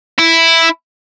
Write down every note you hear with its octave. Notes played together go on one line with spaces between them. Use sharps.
E4